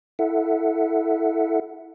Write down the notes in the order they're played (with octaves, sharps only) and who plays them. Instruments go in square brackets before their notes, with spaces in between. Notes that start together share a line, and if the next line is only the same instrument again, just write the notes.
[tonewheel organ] E4 A4 E5 F#5